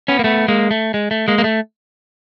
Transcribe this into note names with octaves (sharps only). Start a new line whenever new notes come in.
B3 C#4
A#3
A3 B3
G#3 A#3
A3
G#3
A3
G#3 A#3
A#3
A3